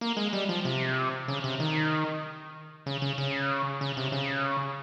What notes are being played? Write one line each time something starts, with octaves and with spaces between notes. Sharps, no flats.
A#3
G#3
G3
F3
C3
C#3
C3
D#3
C#3
C#3
C#3
C#3
C3
C#3